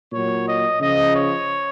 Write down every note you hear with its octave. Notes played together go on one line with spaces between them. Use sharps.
A#2 F#3 C#5
D#5
C#3 F3 D#5
C#5